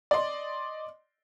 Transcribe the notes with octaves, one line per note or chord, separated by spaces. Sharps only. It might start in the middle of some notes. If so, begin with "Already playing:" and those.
D5 D#5 C6